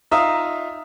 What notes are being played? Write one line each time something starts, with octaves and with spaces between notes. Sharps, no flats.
D#4 F4 E5 F5 A#5 D#6